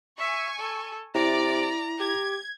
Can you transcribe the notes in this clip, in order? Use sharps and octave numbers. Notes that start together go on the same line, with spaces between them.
E5 G#5 C#6
A4
C3 E4 D5 A#5
G4 G#6